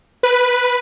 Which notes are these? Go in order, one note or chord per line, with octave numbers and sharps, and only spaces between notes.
B4